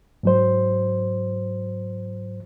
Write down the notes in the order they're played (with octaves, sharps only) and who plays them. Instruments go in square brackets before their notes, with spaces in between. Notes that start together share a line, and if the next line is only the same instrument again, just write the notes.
[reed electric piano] G#2 F#3 C5